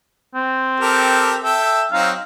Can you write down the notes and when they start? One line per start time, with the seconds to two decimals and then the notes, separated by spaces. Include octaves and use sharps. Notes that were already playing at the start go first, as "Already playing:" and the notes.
0.35 C4
0.80 G4 A4 A#4
1.44 A4 E5 G5
1.92 F#3 C4 D#4 F5